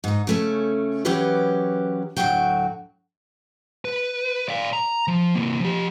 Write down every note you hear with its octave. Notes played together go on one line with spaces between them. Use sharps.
G#2 D#4
C#3 A3 C#4
E3 F#3 C#4 G4 G#4 B4
D2 A2 C3 F#3 F#4 G5
B4
D5 F5
A#5
F3
C3 A#3
F3 G4